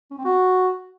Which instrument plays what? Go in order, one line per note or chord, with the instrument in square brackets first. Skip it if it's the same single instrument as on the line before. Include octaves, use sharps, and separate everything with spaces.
[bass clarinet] C#4
C4
F#4